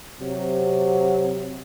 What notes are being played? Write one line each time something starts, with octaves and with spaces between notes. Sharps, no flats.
C3 F#3